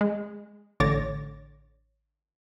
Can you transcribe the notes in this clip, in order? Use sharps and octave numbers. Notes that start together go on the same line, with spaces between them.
G#3
A1 D3 C#5 D6 A6 A#6